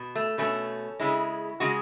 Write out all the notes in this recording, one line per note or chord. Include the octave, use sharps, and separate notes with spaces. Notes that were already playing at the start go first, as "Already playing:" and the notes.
Already playing: B2
A3
B2 A3 C#4
C#3 G#3 E4
C#3 G#3 F#4